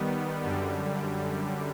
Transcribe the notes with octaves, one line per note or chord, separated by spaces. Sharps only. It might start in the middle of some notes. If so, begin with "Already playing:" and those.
Already playing: D#3 G3 B3
F#2 D3 G3